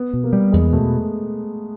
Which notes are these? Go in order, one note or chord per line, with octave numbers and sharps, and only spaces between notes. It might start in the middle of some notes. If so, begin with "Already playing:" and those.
Already playing: B3
B2
A#3
G3
E2 G#3
B2 A3